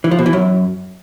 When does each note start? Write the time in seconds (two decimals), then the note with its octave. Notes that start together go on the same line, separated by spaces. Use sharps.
0.04 E3
0.11 F3
0.19 B2
0.26 E3
0.33 F#2